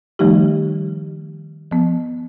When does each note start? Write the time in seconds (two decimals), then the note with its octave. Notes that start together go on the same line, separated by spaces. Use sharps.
0.19 D#3 F3 G3 A3 D#4 G4
1.71 F3 B3